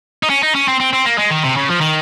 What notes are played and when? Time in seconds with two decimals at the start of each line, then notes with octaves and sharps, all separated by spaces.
0.23 D#4
0.30 C#4
0.43 D#4
0.55 C#4
0.68 C4
0.80 C4
0.93 C4
1.05 A#3
1.18 G#3
1.30 D#3
1.44 C3
1.56 C#3
1.69 F3
1.81 D#3